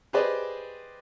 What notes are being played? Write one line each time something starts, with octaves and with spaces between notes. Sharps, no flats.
G4 G#4 B4 C5 D5 D#5